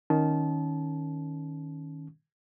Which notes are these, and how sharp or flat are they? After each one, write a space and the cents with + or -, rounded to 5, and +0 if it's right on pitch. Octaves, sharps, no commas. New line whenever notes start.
D#3 +0 C#4 +0 A5 -25